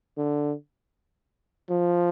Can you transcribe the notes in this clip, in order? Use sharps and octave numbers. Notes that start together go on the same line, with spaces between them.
D3
F3